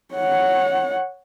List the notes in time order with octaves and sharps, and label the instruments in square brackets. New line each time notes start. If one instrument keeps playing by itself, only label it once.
[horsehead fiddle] C#5 F#5